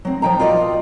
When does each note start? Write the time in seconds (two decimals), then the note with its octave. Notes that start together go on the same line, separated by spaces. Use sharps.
0.05 F#3 C4
0.22 F3 G5 A#5
0.40 F4 F#4 D5 D#5